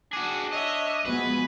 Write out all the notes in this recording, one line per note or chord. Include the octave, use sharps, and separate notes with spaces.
D4 F#4 G#4
C#5 D#5 E5
F3 G#3 B3 F#4 B4 G#5